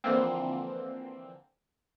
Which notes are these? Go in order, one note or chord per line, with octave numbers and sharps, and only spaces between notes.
D3 E3 F3 A#3 C4